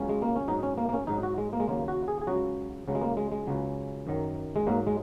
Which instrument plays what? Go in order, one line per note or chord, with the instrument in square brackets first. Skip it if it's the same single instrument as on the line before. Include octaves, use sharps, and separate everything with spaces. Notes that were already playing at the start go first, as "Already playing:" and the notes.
Already playing: [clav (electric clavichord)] C#2 C#3 F#3 C#4
G#3
A#3
C#4
G#2 F#3 D#4
C#4
A#3
A#3
C#4
G#2 F#3 D#4
F#4
G#3
A#3
G#3
D#2 C#3 F#3 A#3
F#4
G#4
G#4
C#2 C#3 F#3 F#4
C#2 C#3 F#3
G#3
A#3
G#3
G#3
C#2 C#3 F#3
F#2 D#3 F#3
G#3
G#2 F#3 A#3
G#3